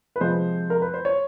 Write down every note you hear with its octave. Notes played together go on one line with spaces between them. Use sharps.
B4
C3 F3 G#3 C4 C5
A#4
B4
C5
C#5